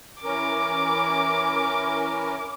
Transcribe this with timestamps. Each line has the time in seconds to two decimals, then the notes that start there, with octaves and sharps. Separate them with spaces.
0.23 E3 C#4 A#4 D6